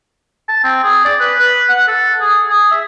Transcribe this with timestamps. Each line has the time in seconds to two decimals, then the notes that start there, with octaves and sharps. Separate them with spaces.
0.49 A5
0.64 C4
0.83 G#4
1.05 D5
1.20 B4
1.39 B4
1.69 F#5
1.88 A4
2.20 G#4
2.50 G#4
2.71 E5